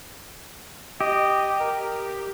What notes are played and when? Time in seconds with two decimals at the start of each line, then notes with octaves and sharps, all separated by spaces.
1.01 G4 D#5
1.60 A#4